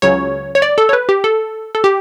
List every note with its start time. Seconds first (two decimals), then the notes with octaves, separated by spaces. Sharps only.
0.02 C#2 C#3 F#3 C#4 C#5
0.55 C#5
0.62 D5
0.78 A4
0.89 C#5
0.93 B4
1.09 G4
1.24 A4
1.75 A4
1.84 G4